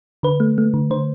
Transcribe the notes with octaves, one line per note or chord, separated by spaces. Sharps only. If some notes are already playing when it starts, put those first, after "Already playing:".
D3 B4
A3
A3
D3
D3 C5